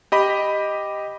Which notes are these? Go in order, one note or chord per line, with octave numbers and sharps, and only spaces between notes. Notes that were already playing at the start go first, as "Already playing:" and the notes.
G4 D#5 B5